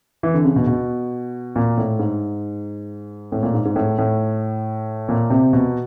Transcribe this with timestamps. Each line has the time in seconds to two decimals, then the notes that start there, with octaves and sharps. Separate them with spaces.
0.23 E3
0.34 D3
0.45 C#3
0.56 B2
0.67 B2
1.56 A#2
1.77 A2
1.99 G#2
3.32 A2
3.43 A#2
3.54 G#2
3.65 G#2
3.76 A2
3.98 A2
5.09 A#2
5.30 C3
5.53 B2